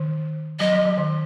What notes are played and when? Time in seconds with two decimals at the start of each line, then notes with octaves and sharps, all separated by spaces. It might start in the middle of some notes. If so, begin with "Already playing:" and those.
Already playing: D#3
0.59 F#3 D#5
0.72 F#3
0.85 F#3
0.97 D#3